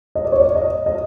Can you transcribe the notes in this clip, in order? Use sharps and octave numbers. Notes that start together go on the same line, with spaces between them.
D#5
D5
C#5
D5
D#5
D#5